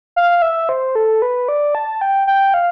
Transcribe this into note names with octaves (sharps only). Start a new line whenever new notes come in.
F5
E5
C5
A4
B4
D5
A5
G5
G5
F5